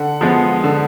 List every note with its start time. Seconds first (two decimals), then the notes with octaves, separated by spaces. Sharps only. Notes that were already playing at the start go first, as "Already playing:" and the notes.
Already playing: D3 F#5
0.21 F3 G#3 B3
0.64 D3